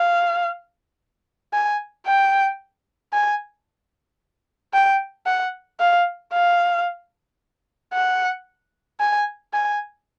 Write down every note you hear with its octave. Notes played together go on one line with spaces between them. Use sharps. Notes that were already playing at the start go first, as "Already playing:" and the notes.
Already playing: F5
G#5
G5
G#5
G5
F#5
F5
F5
F#5
G#5
G#5